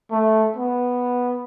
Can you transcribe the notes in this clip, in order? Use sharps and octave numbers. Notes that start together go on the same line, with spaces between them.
A3
B3